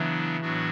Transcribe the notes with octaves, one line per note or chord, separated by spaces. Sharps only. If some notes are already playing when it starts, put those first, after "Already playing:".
Already playing: C#3 E3 F#3 B3 D4
A2 F#3 B3 D4 F#4